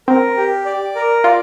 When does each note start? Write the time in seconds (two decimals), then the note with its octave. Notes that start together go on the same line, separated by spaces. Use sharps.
0.08 C4 A#4
0.37 G4
0.66 D5
0.95 A#4
1.24 F4 D5